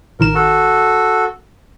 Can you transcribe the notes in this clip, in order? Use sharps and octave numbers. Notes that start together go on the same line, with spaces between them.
A1 D#3 A#4 E7
F#4 A4